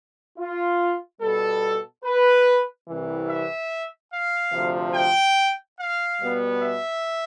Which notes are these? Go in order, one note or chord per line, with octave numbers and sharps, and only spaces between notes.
F4
B2 G3 B3 A4
B4
C2 C3 E3
E5
F5
D2 C3 F3
G5
F5
B2 G3 B3
E5